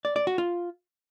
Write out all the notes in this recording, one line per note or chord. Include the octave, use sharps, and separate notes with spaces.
D5
D5
F#4
F4